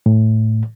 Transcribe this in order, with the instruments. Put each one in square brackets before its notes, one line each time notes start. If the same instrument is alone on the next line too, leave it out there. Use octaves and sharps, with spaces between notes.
[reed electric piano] A2